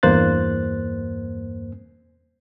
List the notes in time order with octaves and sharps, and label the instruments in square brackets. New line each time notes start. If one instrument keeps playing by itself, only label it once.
[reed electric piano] E2 G2 A#3 C5 F#6 A6